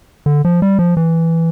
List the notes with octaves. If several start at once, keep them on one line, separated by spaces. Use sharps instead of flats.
D3
F3
G3
F3
E3